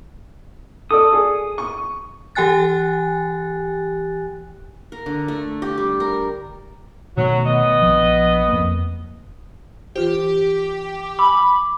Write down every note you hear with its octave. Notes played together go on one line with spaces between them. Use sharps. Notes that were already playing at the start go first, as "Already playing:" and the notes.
A4 D5 D#6
G#4
C#6
E3 G4 G5 G#5 F#6 A6
A#4
D3
A3
G4
G3
A#4
B2 D#3 F#3 A3
B3 D#5
A#1 F3
F2 A#3
E3 F4 G4 C5
G#5 B5 D6 E6